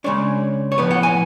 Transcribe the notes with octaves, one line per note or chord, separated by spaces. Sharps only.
C#3 G#3 D4 C#5
C#5
A2 F3 B3 B4
F#5
G#5